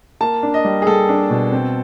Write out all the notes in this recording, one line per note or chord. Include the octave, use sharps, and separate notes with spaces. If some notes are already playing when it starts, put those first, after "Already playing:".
A#3 A5
D4
D#5
G3
G#4
G3 A4
D4
B2
C4